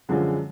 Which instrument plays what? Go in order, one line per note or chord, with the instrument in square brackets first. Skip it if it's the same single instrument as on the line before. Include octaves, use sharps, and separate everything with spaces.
[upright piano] F#2 D3 F3 G#3